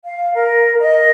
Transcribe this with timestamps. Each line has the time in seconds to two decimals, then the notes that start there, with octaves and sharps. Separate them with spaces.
0.04 F5
0.34 A#4
0.79 D#5